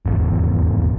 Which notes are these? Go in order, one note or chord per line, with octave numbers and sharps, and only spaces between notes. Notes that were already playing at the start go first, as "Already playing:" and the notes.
D#1 G#1 E2